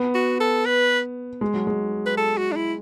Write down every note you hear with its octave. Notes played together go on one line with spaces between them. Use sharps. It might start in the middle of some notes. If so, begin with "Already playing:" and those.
Already playing: B3
F#4
A4
B4
G#3
F#3
G#3
B4
A4
F#4
D4
E4